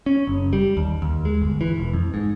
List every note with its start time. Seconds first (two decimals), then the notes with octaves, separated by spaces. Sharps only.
0.06 C#4
0.27 F#1
0.53 G3
0.77 D#2
1.02 D#2
1.25 G#3
1.42 G1
1.61 E3
1.78 E1
1.94 F2
2.14 G#2